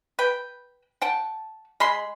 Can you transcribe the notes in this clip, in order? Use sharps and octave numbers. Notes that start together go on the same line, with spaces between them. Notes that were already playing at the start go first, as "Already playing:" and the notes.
B4 G5
F#5 G5 A5
G#3 B5 C6